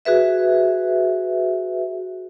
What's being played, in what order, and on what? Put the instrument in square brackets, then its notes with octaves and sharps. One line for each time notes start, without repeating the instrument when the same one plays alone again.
[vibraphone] F#4 G#4 B4 E5